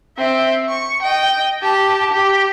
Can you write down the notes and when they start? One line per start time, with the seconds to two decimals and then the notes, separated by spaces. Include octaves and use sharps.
0.18 C4 E5
0.69 C#6
1.02 D#5 G5
1.62 G4 A5
2.12 G4